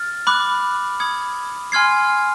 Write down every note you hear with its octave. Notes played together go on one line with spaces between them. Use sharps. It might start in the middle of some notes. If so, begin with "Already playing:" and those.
Already playing: F6 A6
B5 D6 F#6
B5 D#6 G#6 C#7
G#5 C6 F6 G#6 C7